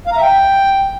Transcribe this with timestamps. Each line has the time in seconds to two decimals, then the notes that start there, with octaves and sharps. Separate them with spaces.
0.07 F5
0.12 A#5
0.17 E5
0.22 G5